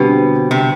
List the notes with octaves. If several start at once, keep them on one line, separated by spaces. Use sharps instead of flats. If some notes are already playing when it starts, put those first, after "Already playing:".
Already playing: B2 D3 G3 C4 G4 B4
C3